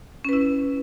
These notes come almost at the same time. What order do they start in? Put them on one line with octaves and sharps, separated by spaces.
C#4 B4 E4